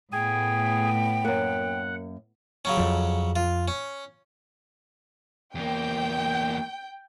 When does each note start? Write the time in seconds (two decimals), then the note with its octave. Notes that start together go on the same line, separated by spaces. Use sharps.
0.13 A2 B3 G#4 G5 G#5
1.25 F#2 A#3 F#5
2.65 C#3 F#3 C#4
2.77 F2 F3
3.36 F4
3.68 C#4
5.55 E2 A#3 G5